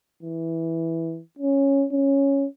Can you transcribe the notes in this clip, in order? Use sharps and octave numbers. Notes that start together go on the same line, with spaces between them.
E3
C#4
C#4